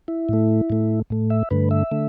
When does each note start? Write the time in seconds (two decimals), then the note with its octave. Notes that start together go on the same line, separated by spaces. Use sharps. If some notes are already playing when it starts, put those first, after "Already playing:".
0.08 E4
0.29 A2 A3
0.70 A2 A3
1.10 A2 A3
1.30 E5
1.51 G2 D3 A3 B4
1.71 E5
1.91 D3 A3